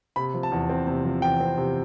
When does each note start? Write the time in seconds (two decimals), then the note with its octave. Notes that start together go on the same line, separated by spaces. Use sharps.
0.16 C3 B5
0.34 F3
0.43 A5
0.52 E2
0.69 C4
0.87 C3
1.05 F3
1.22 E2 G5
1.40 C4
1.58 C3